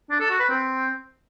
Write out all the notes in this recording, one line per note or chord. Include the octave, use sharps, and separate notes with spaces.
D4
A4
F#4
B4
C4